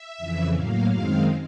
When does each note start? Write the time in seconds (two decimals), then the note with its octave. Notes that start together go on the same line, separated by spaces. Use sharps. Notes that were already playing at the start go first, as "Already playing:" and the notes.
Already playing: E5
0.18 F2 C#3 E3
0.53 A2 F#3 A#3 F5
0.89 F#2 D#3 G#3 C4 F5